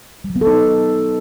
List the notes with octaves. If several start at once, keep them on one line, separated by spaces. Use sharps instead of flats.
G3
F#3
B3
A4
D#4